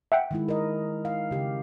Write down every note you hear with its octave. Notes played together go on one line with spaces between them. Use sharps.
E5 F#5 G5
D#3 G#3 E4
A#4 D#5
F5
C#3 G4